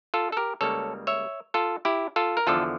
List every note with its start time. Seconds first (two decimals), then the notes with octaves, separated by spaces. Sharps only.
0.14 F4 A4
0.32 A4
0.37 G4 A#4
0.61 C#2 C#3 G3 A#3 A4 C#5
1.07 C#5 E5
1.54 F4 A4
1.85 E4 G4
2.16 F4 A4
2.37 A#4
2.47 E2 D3 F3 F4 A4